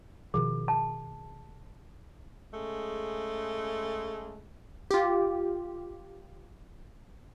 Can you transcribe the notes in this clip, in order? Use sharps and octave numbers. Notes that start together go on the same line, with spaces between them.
B2 D#3 F3 G#4
A5
C#3 G#3 A3
F4 G4